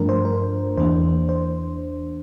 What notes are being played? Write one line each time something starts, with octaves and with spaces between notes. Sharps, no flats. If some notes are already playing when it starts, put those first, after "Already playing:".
Already playing: G2 F3 A3 D4 A#4
C5
A#4
E2 E3 A#3 D4 C5
C5